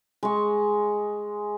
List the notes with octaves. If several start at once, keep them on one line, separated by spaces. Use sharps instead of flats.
G#3 C#6